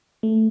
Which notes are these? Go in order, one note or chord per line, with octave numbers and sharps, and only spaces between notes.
A3